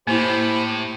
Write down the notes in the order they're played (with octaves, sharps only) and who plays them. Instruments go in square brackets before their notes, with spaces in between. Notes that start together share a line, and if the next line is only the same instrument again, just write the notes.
[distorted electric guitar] A2 [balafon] A#3 E4 [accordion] G4 C5 B5